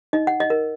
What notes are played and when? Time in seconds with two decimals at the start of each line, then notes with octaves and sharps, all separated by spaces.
0.13 D#4 D#5
0.27 F#5
0.40 D#5
0.50 A#4